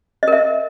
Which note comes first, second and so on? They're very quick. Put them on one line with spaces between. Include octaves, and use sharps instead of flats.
D#5 A#4 E5